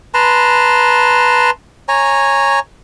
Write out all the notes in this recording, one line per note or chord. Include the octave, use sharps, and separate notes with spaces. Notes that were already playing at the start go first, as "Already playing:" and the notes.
B4 A5 A#5 C6
C#5 G#5 A#5